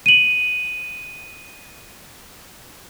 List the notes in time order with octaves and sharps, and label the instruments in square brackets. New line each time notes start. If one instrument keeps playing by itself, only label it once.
[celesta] D#7 F#7